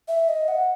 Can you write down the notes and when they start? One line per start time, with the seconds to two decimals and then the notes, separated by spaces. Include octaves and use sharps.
0.08 E5
0.29 D#5
0.48 F#5